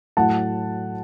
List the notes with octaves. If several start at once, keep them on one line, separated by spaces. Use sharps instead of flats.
A2 F#3 A3 F#5 A5